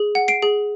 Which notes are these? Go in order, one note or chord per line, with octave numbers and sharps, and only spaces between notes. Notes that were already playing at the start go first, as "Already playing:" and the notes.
Already playing: G#4
F#5
C7 D7
G#4